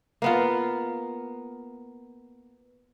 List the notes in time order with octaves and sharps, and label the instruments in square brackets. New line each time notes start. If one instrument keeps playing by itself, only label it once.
[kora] A#3 B3 F4